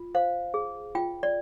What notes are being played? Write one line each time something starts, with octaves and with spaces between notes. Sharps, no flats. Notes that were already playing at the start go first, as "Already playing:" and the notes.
Already playing: F4
C5 F5
G#4
F4 G5
D5